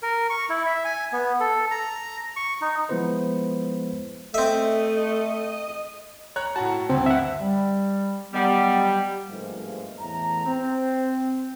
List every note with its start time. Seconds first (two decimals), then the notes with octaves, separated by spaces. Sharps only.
0.03 A#4
0.30 C#6
0.49 E4
0.66 E5
0.85 G#5
1.13 B3
1.40 A4
1.71 A#5
2.36 C#6
2.62 D#4
2.89 F3 G#3 B3 E4 B4 C5
4.34 A3 C4 D#5 E5
6.36 C#5 A#5 F#6
6.56 A2 F#4 A5 A#5
6.90 D2 G2 C4
7.06 E5 F#5
7.40 G3
8.34 D#3 F#3 G3 B3
9.28 G1 G#2 F3 A3 A#3 F5
9.99 E2 A2 A3 A#5
10.45 C4